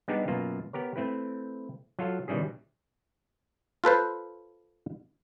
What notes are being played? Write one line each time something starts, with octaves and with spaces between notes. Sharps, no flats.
G3 G#3 B3 D4 D#4 G4
F#2 B2 A#3 F4
B3 G4 A#4 C#5
A3 C4 E4 B4
F#3 F4 A4 F5
B2 D#3 E3 G3 C#4 G#4
F4 A4 B4 C5